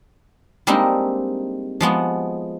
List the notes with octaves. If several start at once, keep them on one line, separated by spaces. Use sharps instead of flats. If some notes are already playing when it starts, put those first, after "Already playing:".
G3 G#3 A#3 C4 D4 D#4
F3 G#3 B3 F#4